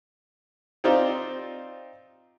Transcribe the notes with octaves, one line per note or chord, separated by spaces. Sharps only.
C4 D#4 F4 G4 C5 D5